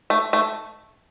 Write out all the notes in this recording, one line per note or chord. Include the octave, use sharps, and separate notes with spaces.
A3
A3